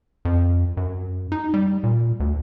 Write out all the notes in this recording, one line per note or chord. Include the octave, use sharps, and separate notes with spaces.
F2
F#2
D#4
G3
A#2
D2